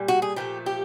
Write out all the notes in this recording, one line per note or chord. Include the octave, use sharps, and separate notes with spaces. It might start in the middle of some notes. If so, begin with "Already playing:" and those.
Already playing: A#2 G3
F#4
G#4
A#2 F3 A3 G4
G4